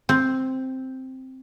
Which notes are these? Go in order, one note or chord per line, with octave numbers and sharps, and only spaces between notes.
C4